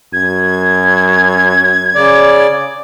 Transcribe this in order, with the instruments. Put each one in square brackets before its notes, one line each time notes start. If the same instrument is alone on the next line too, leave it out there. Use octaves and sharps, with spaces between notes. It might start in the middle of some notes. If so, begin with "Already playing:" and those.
[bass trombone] F#2 [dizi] G#6
[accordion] C#3 D5